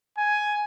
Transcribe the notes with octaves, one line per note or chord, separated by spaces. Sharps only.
G#5